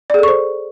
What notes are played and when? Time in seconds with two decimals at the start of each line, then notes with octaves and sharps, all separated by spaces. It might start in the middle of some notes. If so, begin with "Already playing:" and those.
0.10 D5
0.14 G#4
0.19 A4
0.23 C#6
0.28 C5